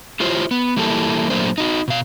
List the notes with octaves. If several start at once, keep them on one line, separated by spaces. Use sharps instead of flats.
E4 F4 G4 C5 C#5
B3
E3 G3 A#3 E4 G4 A4
A#2 F#3 A3 A#3 D4 C5
D#4 F#4
B2 F5